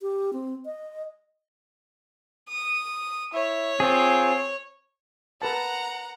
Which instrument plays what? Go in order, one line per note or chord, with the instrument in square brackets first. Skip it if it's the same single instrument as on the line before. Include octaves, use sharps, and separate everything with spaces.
[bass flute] G4
C4
D#5
[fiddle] D#6
[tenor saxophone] E4 [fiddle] C#5
[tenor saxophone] C4 [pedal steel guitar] F4 G#4
[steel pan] A#4 B4 A5 [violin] F#5 A#5